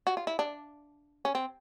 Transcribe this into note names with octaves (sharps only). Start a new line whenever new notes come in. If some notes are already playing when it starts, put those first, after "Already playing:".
F#4
F4
E4
D4
C#4
C4